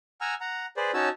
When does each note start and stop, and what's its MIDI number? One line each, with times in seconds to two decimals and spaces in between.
0.21 0.34 78
0.21 0.34 80
0.21 0.34 82
0.21 0.34 88
0.21 0.34 89
0.41 0.66 78
0.41 0.66 82
0.77 0.91 68
0.77 0.91 71
0.77 0.91 72
0.77 0.91 74
0.94 1.09 61
0.94 1.09 63
0.94 1.09 66
0.94 1.09 73
0.94 1.09 81
0.94 1.09 88